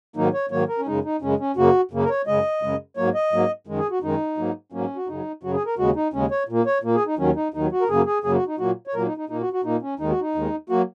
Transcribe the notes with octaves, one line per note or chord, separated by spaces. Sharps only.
G#2 D#3 F#3 A#3 D#4
C#5
G#2 D#3 F#3 A#3 C#5
A#4
C#4
F#2 C#3 G#3 D#4
D#4
F#2 C#3 G#3 C#4
C#4
F#2 C#3 A#3 F#4
F#2 C#3 A#3
A#4
C#5
F#2 C#3 G#3 D#5
F#2 C#3 G#3
G#2 F#3 A#3 C#5
D#5
G#2 F#3 A#3
F#2 D#3 G#3
G#4
F#4
F#2 D#3 G#3 D#4
G#2 F#3 A#3
G#2 F#3 A#3 C#4
F#4
F#2 C#3 F#3 D#4
F#2 C#3 F#3 F#4
G#4
A#4
D#2 C#3 G#3 F#4
D#4
D#2 C#3 G#3 C#4
C#5
A#2 A#3
C#5
A#2 A#3
G#4
D#4
D#2 D#3 F#3 C#4
D#4
D#2 D#3 F#3 D#4
F#4
A#4
F#2 C#3 F#3 A#3 G#4
G#4
F#2 C#3 F#3 A#3 G#4
F#4
D#4
A#2 F#3 A#3 F#4
C#5
A#2 F#3 A#3 A#4
D#4
D#4
A#2 A#3 D#4
F#4
F#4
A#2 A#3 D#4
C#4
D#2 D#3 G#3 D#4
F#4
D#4
D#2 D#3 G#3
F#3 A#3 F#4